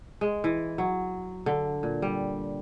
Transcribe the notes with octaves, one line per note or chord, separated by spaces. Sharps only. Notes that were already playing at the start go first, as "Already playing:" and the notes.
G#3
E3
F#3
D3
A#2
G3